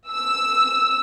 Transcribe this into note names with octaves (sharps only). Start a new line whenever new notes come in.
E6